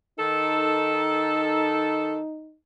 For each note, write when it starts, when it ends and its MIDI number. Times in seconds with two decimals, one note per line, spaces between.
0.18 2.18 51
0.18 2.56 63
0.18 2.18 69